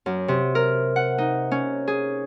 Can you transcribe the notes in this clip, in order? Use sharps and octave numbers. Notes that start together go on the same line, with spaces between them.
F#2
C3
A#4
F#5
D#4
C#4
G#4